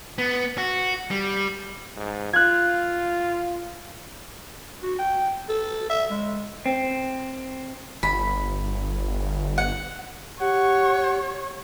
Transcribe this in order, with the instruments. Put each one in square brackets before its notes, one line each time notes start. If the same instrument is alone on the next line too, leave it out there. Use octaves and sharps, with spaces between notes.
[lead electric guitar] B3
F#4
G3
[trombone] G#2
[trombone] F4 [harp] F#6 G#6
[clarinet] F#4
G5
A4
E5
G#3
[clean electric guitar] C4
[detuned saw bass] G1 [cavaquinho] B5
[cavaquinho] F#5
[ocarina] G4 [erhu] C#5 [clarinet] F#5